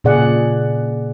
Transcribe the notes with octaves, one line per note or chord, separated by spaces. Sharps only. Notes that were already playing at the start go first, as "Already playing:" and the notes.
A#2 C#3 G#4 D5 F#5